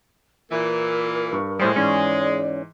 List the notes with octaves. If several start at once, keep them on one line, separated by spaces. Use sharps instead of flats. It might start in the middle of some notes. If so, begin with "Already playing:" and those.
A#2 E3 A#4
G2 C#6
A2 G3 G#3 C5 D#6
G#2 E3 C#4 D5